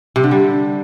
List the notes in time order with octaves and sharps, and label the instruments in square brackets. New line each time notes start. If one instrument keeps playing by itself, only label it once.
[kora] C3
D3
G3